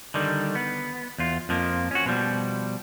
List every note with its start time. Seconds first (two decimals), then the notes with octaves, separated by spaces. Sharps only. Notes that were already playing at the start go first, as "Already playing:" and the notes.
0.14 D3 D#3 G3
0.55 B3
1.18 E2 F4
1.49 F2 F3 A#3
1.91 C#4 F#4
2.06 B2 F3 G3